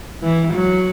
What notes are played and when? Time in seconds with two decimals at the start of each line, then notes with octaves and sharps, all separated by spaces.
0.23 E3
0.53 F#3